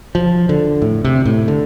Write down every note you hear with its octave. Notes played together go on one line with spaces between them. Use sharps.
F3
D3
A2
C3
A2
D3